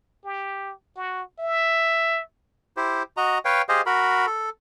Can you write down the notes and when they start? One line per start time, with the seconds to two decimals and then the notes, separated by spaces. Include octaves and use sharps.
0.24 G4
0.96 F#4
1.39 E5
2.77 E4 G4 C5
3.17 F#4 D#5 A#5
3.45 B4 C#5 F5 G5
3.69 G4 G#4 C5 D#5 F5
3.86 F#4 A#4 B5
4.27 A4